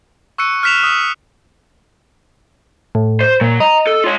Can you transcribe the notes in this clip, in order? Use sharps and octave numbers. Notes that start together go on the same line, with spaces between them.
C#6 E6 F#6 C#7 D#7
F6 F#6 B6 E7 F7
D#6
A2
C5
A#2 F#3
D#5 A#5
A4
F4 C#5